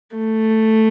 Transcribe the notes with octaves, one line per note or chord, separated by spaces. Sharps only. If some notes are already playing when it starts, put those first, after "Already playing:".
A3